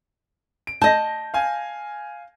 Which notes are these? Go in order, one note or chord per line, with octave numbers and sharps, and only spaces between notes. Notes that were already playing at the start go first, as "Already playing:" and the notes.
D7
D#5 A5 G6 A#6
F5 G#5